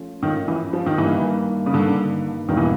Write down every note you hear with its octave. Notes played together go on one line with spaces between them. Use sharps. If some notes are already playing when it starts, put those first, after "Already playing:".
Already playing: F3 A3 C#4 F4
D#3 F3 A3 C#4 F4
E3
F3
D#3
G2 D#3 E3 G3 A#3 D4
C#3
G2 D3 D#3 G3 A#3 D4
E2 B2 D#3 G3 A#3 D4
E3